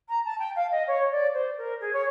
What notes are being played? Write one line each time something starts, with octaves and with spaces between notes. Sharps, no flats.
A#5
A5
G5
F5
D#5
C#5
D5
C5
A#4
G#4
C#5